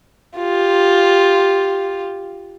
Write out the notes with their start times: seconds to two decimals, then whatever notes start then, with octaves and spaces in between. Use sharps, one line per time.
0.37 F4 G4